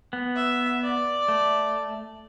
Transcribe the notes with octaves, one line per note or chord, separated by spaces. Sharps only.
B3
E5
D5
A3